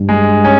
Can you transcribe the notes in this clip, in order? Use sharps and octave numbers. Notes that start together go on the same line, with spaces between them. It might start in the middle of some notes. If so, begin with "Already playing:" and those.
Already playing: G2
G#3
C#4